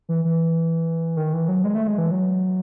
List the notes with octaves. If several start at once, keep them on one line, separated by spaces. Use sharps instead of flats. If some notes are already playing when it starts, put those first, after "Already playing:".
E3
E3
D#3
E3
F#3
G#3
A3
G#3
E3
F#3